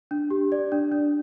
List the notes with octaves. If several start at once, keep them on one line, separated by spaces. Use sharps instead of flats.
D4
G4
D5
D4
D4